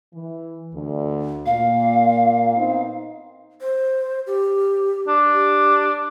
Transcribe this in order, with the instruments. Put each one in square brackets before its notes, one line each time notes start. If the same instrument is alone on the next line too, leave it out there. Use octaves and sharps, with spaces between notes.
[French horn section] E3
D2
[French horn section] A#2 [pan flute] F5
[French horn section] B3 C4 D#4
[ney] C5
G4
[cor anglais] D4
[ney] G4